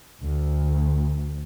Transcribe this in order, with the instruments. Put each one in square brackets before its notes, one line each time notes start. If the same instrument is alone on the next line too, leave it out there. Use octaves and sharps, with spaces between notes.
[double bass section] D2